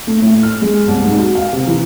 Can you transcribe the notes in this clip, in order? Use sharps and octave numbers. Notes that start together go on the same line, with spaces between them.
A3
A2
F6
G#3
C2
G#2
F#4
F5
C3
E3